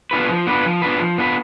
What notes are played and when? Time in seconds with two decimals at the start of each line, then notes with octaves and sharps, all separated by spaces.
0.11 B3 D4 F4 B4
0.29 F3
0.47 B3 D4 F4 B4
0.64 F3
0.82 B3 D4 F4 B4
1.00 F3
1.18 B3 D4 F4 B4